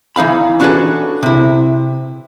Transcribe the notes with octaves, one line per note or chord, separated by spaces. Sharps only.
E3 D#4 F5 B5
C#4 D4 F#4 G#4 A4 B4
C3 E4